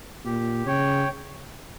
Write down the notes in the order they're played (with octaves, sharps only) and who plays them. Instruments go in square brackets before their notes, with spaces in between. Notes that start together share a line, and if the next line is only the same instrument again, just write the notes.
[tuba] A#2 [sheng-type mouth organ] G4
[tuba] C#3 [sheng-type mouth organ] C#5 G5